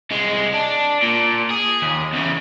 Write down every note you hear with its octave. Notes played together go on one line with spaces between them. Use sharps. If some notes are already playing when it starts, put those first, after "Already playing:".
C2 G#3
D4
A#2
G#4
D#2
E2 C#3